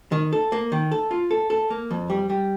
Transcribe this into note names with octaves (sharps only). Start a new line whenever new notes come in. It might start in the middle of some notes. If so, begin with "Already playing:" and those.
D#3
A4
A#3
D#3
A4
F4
A4
A4
A#3
F2
G3
G3